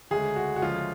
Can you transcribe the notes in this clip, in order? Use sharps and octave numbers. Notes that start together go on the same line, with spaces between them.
D2 C#3 G#3 G#4
F#4
F#4
D2 C#3 F3 G#3 F4